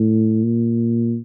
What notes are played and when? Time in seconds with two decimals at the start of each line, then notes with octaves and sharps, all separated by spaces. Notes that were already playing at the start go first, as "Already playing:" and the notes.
Already playing: A2
0.43 A#2